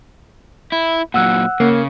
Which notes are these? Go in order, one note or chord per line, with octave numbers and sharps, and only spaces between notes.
E4
A#2 F#3 F#5 E6 F#6
C#3 A#3